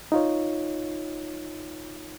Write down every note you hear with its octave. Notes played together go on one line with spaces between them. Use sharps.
D#4 F4 C#5